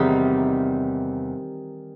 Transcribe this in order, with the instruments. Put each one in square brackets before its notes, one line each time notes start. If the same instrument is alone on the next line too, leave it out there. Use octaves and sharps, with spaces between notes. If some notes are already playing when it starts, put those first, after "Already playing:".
Already playing: [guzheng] E2 C3 D#3 G3 D#4